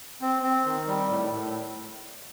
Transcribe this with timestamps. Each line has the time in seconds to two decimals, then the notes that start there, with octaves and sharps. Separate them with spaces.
0.21 C4
0.43 C4
0.66 D#3
0.88 G3
1.09 A2
1.32 A2